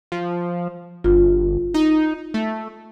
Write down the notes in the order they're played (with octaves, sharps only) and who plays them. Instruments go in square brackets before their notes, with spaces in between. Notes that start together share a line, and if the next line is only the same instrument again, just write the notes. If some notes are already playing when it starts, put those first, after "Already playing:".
[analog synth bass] F3
[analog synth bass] G1 [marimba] F4
[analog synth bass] D#4
A3